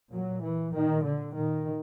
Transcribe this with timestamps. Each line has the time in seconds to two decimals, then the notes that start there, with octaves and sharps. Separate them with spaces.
0.11 A#2 F#3
0.42 E3
0.73 A#2 D#3
1.04 D3
1.35 A#2 D#3